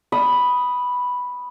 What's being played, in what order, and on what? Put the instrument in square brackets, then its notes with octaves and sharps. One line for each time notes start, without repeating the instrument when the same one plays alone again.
[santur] B5 D#6